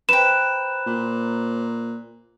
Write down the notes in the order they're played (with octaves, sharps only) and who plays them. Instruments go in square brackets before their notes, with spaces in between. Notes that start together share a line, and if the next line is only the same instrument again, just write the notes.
[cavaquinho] B4 G5 [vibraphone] C5 A#5 [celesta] E7
[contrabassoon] A#2